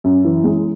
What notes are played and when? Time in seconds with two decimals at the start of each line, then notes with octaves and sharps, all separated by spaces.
0.04 F#2
0.25 E3
0.44 G#3